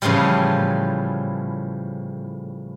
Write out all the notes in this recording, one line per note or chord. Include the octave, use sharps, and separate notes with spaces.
A2 C#3 E3 F3 G3